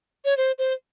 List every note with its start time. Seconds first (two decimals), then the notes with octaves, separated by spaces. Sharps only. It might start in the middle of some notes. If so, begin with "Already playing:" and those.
0.25 C#5
0.37 C5
0.59 C5